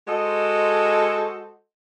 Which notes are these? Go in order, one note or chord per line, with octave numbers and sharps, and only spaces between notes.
G#3 F#4 A4 C5 D#5